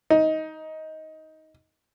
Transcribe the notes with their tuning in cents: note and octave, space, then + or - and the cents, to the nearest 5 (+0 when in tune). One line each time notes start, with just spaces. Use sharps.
D#4 +15